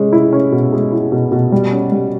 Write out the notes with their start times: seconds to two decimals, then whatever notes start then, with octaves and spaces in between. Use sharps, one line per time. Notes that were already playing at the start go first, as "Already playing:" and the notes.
Already playing: G#3 C#4
0.13 E4
0.33 C#4
0.52 B2
0.73 G#3
0.92 E4
1.12 B2
1.32 B2
1.52 G3
1.72 C#4
1.92 G3